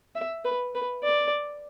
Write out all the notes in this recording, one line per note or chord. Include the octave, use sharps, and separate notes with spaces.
E5
B4
B4
D5